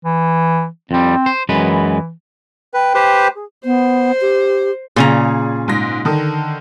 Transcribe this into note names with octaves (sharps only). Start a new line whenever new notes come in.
E3
F2 G3 C4
C5
F#2 E3 G#3 B4
B4 G5
G4 B4 C5
G#4
B3 C5
G4
A#2 C#3 G#4 A#5
G#2 A#6
D3 D#3